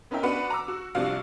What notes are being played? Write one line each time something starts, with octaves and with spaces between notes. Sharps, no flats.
B3 C#4 D#4 A#4 E5 G5
B3 D4 F#4 B4 F#5
A#5 D6 E6
F#4
C2 C3 F3 D4 F#4 F5